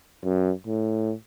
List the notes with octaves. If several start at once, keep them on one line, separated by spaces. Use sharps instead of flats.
F#2
A2